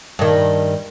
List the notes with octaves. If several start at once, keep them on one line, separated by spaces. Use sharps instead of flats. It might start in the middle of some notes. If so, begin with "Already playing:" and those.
G2 D#3